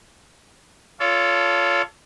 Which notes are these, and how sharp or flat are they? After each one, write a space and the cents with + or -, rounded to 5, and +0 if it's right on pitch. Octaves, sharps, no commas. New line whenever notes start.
F4 -10 A4 +0 C#5 +30